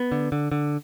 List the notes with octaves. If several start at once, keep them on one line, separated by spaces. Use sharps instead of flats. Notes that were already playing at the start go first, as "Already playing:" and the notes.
Already playing: B3
D3
D3
D3